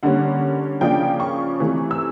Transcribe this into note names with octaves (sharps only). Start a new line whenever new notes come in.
D3 G3 A#3 C#4 F#5
C#3 F3 A#3 D4 G5
C#6
C3 E3 A3
E6